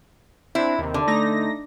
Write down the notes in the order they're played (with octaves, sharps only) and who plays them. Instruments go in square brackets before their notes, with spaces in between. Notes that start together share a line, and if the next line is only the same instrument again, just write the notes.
[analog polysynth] C4 D4 [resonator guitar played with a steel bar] E4
[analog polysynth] D#2 C3
[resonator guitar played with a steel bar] D3
[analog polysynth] A3 D#4 A#6